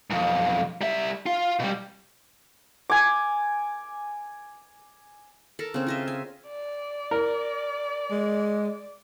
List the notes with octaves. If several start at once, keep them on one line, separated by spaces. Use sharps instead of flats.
B1 F2
G3 E5
F4
B2 G3
G#5 D6
A4 A#4
C#3 C4
F4 D#5 E5
G#5
D5
A#4
G#3